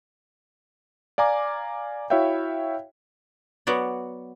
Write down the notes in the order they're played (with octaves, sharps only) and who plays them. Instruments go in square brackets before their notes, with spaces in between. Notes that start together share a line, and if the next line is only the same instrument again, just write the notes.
[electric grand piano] D5 F5 G#5 A#5 D6
E4 F#4 C#5 E5 F5 G5
[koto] F#3 B3 F#4 D5